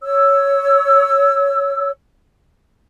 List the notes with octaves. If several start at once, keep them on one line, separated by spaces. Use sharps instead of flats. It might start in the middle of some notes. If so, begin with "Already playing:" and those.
C#5 E6